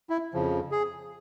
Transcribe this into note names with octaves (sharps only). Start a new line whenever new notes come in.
E4
F2 C#3 F3
G#4